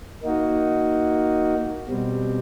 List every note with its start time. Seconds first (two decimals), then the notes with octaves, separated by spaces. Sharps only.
0.23 A#3 D#4 F#4
1.88 B2 G3 C4